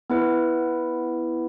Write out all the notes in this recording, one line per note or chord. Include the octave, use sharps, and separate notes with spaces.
B3 E4 B4